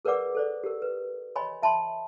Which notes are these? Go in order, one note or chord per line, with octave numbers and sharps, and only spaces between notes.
G#4 A#4 B4 D5 F#5 D6
A4 C5 D5
G4 A#4
B4
C#5 D#5 G#5 B5 C6
E5 A5 B5 C6